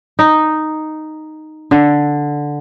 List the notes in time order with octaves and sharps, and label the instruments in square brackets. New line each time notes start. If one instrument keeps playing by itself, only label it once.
[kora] D#4
D3